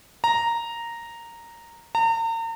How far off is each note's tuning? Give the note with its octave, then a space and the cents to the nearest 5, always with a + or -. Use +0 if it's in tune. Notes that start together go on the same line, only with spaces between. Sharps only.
A#5 -5
A#5 -40